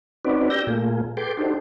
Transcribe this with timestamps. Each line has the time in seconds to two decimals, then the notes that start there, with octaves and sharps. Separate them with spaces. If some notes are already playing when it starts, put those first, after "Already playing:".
0.25 C4 C#4 D#4 F#4 B4 D5
0.50 G4 D5 E6 G6 A#6
0.67 A#2 A3 A#3 F4 G#4
1.17 G#4 A4 B4 G5 C6 D6
1.37 D4 D#4 F#4 G4 A4 C5